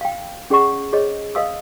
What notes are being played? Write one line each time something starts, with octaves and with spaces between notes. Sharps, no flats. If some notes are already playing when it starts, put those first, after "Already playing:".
F5 G5
C#4 G#4 D5 F#5 C#6
G#4 C5 C#5 D#5
B4 D#5 F5 D#6 E6